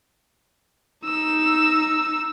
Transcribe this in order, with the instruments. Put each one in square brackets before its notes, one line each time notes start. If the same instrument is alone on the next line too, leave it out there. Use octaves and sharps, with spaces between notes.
[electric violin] D#4 E6